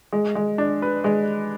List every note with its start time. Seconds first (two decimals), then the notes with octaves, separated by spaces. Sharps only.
0.13 G#3
0.35 G#3
0.58 D4
0.82 B4
1.04 G#3